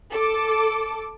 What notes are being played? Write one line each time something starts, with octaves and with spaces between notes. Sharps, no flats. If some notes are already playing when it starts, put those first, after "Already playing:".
A4 D6